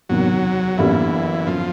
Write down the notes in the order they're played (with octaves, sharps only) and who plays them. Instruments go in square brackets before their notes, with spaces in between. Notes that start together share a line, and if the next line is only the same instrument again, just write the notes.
[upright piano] F#1 E2 C3 D#3 [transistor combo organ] F#3
[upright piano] G1 F#2 D3 G3 A#3 [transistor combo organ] E3
[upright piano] G1 F#2 D3 [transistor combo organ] F3